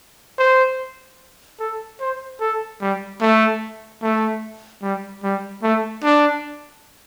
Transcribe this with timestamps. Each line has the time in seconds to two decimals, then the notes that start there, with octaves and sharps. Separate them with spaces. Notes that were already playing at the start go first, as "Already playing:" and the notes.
0.39 C5
1.59 A4
2.00 C5
2.40 A4
2.81 G3
3.21 A3
4.02 A3
4.82 G3
5.23 G3
5.63 A3
6.03 D4